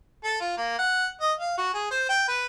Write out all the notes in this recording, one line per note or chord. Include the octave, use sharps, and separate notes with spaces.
A4
F4
A#3
F#5
D#5
F5
F#4
G#4
C5
G5
B4